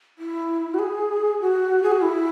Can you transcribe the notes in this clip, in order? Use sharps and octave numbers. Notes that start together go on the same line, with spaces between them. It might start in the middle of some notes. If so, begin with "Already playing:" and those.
E4
F#4
G#4
F#4
G#4
F#4
E4